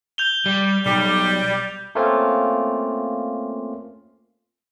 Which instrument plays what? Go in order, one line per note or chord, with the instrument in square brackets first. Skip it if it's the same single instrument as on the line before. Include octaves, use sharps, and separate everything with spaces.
[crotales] G6 F7 G7
[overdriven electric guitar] G3
[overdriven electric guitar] B1 [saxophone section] G3
[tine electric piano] A3 A#3 C4 C#4 F4